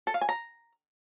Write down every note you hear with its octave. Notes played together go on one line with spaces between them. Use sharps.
A4
F5
G#5
A#5